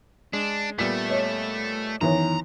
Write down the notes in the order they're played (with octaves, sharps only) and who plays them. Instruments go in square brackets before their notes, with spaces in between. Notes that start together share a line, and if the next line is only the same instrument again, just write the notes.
[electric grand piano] G#3 [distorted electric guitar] D4
[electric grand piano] A#2 G3 B3 [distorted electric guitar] A3 [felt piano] B6
[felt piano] C#5 D#5
[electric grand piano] F#2 B3 [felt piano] D#3 E3 C#5 [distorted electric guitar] A#5